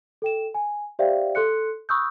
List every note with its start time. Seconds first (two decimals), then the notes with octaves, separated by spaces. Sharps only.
0.22 A4 G5 E7
0.54 G#5
0.99 G4 C5 D5 E5 F5 G5
1.35 A4 C6 F#6 C#7
1.89 B5 C#6 D#6 E6 F#6 G6